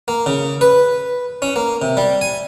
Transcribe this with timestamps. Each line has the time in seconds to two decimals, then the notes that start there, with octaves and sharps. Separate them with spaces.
0.08 A#3
0.26 C#3
0.61 B4
1.42 C#4
1.56 A#3
1.82 C3
1.97 G3
2.21 G#5